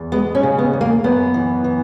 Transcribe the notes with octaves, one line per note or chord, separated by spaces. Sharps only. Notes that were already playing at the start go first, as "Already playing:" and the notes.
Already playing: E2
G#3 B3
C#4
C#3
B3
E2
A#3
F#2 B3
E3
E3